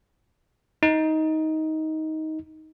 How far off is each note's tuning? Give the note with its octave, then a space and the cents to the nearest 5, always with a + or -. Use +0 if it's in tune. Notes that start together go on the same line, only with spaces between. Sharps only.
D#4 +15